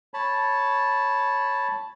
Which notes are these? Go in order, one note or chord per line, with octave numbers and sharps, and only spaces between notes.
C#5 A5 B5